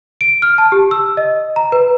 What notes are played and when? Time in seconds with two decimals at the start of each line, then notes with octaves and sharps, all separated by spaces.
0.21 D7
0.42 F6
0.58 A5
0.72 G4
0.91 E6
1.17 D#5
1.56 A#5
1.72 B4